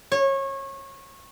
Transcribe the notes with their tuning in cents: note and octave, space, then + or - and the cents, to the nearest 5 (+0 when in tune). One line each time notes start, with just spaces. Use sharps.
C#5 -25